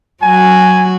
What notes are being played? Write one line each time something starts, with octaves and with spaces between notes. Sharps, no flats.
F#3 F#4 G#5